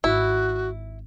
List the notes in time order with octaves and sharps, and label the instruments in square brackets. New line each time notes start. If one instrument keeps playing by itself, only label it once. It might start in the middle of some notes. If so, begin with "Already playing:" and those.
[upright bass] G#1 [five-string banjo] E4 [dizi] F#4